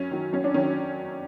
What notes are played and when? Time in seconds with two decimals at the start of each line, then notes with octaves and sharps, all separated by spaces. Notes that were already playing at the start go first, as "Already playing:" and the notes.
Already playing: F#2 C#4
0.11 D#3 F#3
0.33 F#2 C#4
0.44 D4
0.54 D#3 F#3 C#4